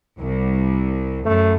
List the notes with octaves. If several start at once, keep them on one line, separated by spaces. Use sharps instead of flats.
C2
F#2 A3